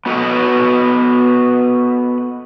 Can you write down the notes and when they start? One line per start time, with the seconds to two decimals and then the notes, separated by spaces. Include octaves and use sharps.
0.06 B3 F#4 A4 B4 D#5